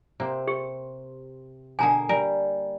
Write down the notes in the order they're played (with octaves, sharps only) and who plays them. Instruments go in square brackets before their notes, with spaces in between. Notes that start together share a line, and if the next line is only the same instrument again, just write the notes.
[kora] C3 C4 [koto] A#3
[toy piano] G4
[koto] B2 D3 [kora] A#3 G#4 G5 [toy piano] G#5 A#5
[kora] G3 [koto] A#4